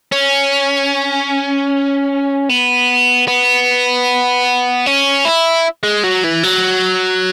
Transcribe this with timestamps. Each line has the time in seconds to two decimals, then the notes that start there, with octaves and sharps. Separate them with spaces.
0.12 C#4
2.49 B3
3.28 B3
4.86 C#4
5.25 E4
5.84 G#3
6.04 F#3
6.24 E3
6.43 F#3